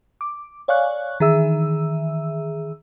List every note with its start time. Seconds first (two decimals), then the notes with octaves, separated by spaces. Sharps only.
0.21 D6
0.68 C#5 D5 F5 G#5 C#6 F#6
1.20 D#3 E3 G#4 E5 E6